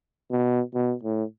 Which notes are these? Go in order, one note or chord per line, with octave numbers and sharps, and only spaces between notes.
B2
B2
A2